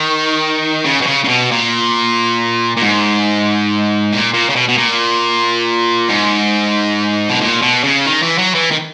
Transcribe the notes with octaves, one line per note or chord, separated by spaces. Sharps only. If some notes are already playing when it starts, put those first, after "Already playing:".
Already playing: D#3
C#3
B2
C#3
C#3
B2
A#2
A#2
G#2
A#2
A#2
C#3
B2
B2
A#2
G#2
B2
A#2
B2
C#3
D#3
E3
F#3
E3
D#3